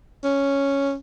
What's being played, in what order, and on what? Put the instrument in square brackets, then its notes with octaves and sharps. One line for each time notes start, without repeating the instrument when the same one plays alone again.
[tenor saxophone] C#4